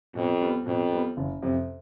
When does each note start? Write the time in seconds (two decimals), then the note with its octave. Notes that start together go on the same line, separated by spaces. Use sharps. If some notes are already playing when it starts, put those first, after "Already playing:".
0.15 F2 B2
0.41 G3 B3
0.65 F2 B2
0.91 G3 B3
1.17 F#1
1.42 F2 C3